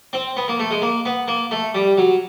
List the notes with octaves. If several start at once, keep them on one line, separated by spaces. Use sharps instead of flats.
C4
B3
A#3
A3
G#3
A#3
B3
A#3
A3
G3
F#3